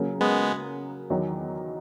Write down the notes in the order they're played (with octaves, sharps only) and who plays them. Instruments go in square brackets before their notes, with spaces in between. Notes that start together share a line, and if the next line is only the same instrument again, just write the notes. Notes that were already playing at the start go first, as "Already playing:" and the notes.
Already playing: [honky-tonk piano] C#3 F#3 A#3
[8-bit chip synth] G#3 B3
[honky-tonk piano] E2 D#3 F#3